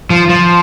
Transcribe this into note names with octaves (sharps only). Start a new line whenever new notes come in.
F3
F3